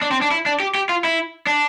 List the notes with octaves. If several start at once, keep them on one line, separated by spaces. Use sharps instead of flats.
D4
C4
D4
E4
D4
G4
G4
F4
E4
D4